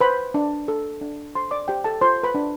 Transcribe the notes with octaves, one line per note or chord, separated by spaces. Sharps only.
B4 C5 B5
D4
A4
D4
A4 C5 C6
D5 D6
G4 C5 G5
A4 A5
F4 C5 C6
B4 B5
D4